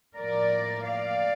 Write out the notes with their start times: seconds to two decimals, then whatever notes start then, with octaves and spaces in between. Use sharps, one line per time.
0.17 A2 F3 A#3 A#4 D5
0.85 D5 F5